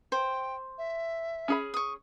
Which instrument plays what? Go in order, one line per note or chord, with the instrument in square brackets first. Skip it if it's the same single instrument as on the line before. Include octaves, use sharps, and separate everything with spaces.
[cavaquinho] C5 [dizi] G5
[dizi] E5
[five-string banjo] C#4 G#4 B5
[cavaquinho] C#6 D#6